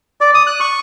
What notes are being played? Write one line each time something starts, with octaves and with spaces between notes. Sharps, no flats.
D5
D#6
F#6
C#6